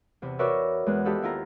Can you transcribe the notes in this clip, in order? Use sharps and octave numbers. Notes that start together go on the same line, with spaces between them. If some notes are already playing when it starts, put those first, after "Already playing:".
E2 C3
F#4 A#4 B4 C#5 D5 E5
E2 G#3 B3 F#6
F4 G4 A4 D#5 E5 F#5
D#2 E4 F4 A#5